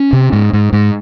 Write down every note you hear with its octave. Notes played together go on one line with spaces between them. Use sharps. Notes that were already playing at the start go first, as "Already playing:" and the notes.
Already playing: C#4
C3
G#2
G#2
G#2